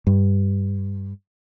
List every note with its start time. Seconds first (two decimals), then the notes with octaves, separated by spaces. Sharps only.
0.07 G2